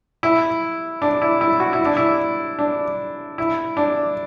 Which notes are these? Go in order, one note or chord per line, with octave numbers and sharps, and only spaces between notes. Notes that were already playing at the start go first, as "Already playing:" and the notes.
E4
D4
E4
E4
F#4
E4
D4
E4
D4
E4
D4